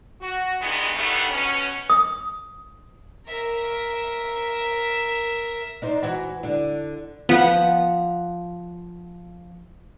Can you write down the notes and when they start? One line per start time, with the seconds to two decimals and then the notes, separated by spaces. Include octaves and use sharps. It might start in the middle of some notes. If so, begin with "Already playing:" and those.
0.21 F#4
0.62 G2 D#3 E3 G#3 B3
0.95 D3 D#3 G3 A3 B3
1.30 B2 C#4
1.90 D#6
3.28 A#4 E5
5.82 D4 D#4 C5
6.03 E3 F#4
6.43 D3 D4
7.29 F3 B3 F#5